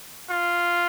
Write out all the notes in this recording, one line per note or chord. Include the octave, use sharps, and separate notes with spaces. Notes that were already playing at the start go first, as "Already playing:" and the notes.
F4